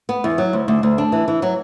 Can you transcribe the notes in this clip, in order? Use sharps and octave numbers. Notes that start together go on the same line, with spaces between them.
B3
E2
F#3
D2
D2
D2
D4
E3
E3
F#3